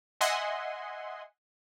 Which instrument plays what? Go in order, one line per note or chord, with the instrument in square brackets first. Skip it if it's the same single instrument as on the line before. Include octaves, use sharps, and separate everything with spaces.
[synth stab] D#5 E5 F#5 G#5 C6